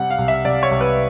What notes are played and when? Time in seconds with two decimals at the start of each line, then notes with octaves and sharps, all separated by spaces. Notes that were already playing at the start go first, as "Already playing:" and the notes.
Already playing: C3 G3 F#5
0.10 F5
0.19 C2
0.28 E5
0.45 C2 D5
0.63 C#5
0.71 C2
0.81 B4